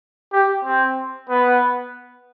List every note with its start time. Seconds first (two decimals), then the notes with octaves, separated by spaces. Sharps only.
0.33 G4
0.65 C4
1.29 B3